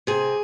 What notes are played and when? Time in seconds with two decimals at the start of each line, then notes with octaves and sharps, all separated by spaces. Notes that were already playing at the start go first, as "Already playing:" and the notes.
0.07 C3 G#4